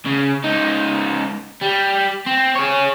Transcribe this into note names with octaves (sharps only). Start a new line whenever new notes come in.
C#3
C#2 D#4
G3
C4
G#4 C#5